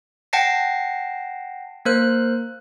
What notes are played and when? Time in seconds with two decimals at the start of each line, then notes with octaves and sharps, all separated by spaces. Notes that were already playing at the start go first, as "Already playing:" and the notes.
0.33 F#5 G5 A5 A#6 C7
1.85 A#3 A#4 C5 F#6